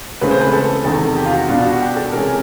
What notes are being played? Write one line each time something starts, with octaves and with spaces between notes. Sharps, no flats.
C#2 C#3 E3 A3 C4 B4
C5
B4
A4
E2 C3 D#3 A4
G4
F4
F#4
B2 G3 B3 D4 F4
F#4
G4
A4
C3 E3 G#3 C#4 A#4